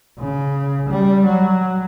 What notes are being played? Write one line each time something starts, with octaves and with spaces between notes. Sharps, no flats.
C#3
G3
F#3